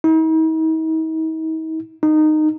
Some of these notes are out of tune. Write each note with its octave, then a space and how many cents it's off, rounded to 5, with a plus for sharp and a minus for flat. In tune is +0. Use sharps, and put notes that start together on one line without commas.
D#4 +45
D#4 -15